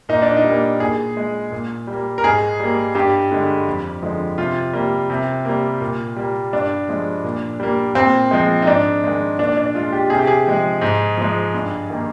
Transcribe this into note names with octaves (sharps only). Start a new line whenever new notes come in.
A#2 D#4
D4
D#4
G3
A#3
A#2 G#4
G#3
A#2
G3
A#3
A#4
G#2 G#4
G3 A#3
G2 G4
D3 G#3
F2
D3 F3 G#3
C3 F4
G3 A#3
C3
G3 A#3
A#2
G3 A#3
G2 D4
F3 G#3
A#2
G3 A#3
A#2 C4
F3 G#3
D#4
G#2 D4
D#3 G#3
A#2 D4
D4
G#3 F4
G4
C3 G#4
G4
G#4
F3 G#3
G#2
F3 G#3
G2
D#3 A#3